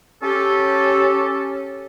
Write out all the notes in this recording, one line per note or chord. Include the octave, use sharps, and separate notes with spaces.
C#4 G4 A4